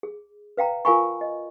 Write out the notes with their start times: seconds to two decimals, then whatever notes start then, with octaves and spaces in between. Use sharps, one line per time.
0.03 G#4
0.57 B4 F5 G5 A#5
0.85 F4 A#4 F5 G#5 B5 C#6
1.21 D#5